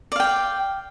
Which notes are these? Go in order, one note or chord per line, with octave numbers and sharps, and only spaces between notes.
D5 F5 G5